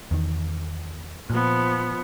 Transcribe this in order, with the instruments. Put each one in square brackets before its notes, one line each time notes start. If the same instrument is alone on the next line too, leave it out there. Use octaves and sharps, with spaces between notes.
[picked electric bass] E2 D#3
[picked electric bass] A#2 [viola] F3 B3